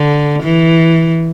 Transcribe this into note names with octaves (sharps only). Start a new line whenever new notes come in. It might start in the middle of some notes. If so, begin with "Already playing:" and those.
Already playing: D3
E3